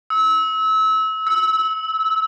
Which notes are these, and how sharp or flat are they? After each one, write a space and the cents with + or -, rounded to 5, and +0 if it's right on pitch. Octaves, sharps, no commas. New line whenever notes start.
E6 -30
E6 -5